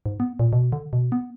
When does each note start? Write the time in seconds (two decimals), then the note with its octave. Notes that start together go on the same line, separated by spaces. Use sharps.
0.06 G#2
0.20 B3
0.39 A#2
0.53 B2
0.72 D3
0.93 B2
1.12 B3